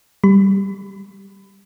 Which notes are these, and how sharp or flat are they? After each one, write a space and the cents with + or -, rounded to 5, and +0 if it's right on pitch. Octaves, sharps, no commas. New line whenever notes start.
G3 +0 B5 +30